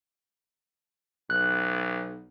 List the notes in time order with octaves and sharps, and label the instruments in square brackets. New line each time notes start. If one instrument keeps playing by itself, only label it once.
[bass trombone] B1 [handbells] F#6